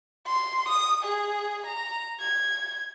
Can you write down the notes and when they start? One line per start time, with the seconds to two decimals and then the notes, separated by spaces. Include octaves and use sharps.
0.27 C6
0.69 D#6
1.04 G#4
1.67 A#5
2.20 G#6